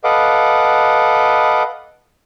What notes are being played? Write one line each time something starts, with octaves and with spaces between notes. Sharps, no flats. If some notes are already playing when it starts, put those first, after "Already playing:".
A4 B4 D#5 F5 F#5 D6